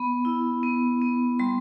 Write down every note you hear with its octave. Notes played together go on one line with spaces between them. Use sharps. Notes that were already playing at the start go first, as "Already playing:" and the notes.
Already playing: B3 B5
E4
B3
B3
G3 C6